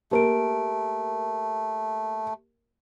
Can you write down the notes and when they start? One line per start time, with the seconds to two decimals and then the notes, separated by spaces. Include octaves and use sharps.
0.11 A3 A#3 G4 A#4 D7